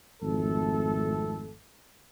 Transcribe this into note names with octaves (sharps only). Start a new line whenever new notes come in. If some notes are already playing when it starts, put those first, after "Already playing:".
G#1 F2 A3 A4